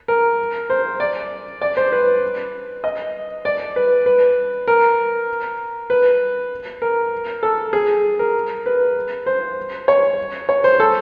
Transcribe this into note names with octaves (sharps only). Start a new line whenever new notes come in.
A#4
C5
D5
D5
C5
B4
D#5
D5
B4
B4
A#4
B4
A#4
A4
G#4
A#4
B4
C5
C#5
C#5
C5
A4